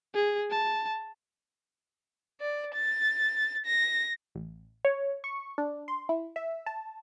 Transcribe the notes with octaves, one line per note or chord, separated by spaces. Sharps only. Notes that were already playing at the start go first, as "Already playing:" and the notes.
G#4
A5
D5
A6
A#6
A1
C#5
C#6
D4
C6
E4
E5
A5